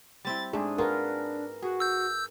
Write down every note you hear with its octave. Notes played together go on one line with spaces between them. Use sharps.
G3 C4 E4 A6
G#2 A3 D4 G#4
F4 F#4 G#4 A#4 B4
F#4 G#4
E6 G6